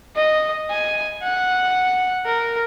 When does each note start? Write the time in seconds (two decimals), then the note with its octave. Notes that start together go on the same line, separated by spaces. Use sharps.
0.16 D#5
0.71 G#5
1.23 F#5
2.26 A#4